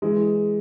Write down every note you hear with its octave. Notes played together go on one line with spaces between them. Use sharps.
E3 G#3